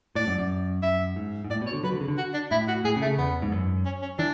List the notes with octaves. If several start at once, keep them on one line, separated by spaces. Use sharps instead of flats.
A2 D5
F#2
F#2
F#2 E5
G#2
G#2
A2 D5
B2
C#5
D3
F#3 B4
D3
C#3
D3
F#4
D4
A2 E4
F#4
A2 G#4
C#3
A3
C#3
E2 B3
G#2
F#2
C#4
C#4
E3 D4